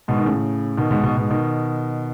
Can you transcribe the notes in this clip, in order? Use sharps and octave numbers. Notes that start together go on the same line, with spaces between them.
G#2 B2
D#3
A2 C#3
B2 D#3
G#2 B2
G#2 B2
G#2 B2
B2 D#3